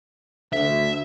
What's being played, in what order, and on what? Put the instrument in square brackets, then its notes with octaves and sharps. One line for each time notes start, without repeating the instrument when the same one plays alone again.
[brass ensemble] D2 [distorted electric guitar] E5